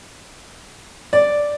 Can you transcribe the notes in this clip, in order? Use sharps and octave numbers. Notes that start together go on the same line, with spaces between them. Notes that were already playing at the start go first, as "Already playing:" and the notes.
D5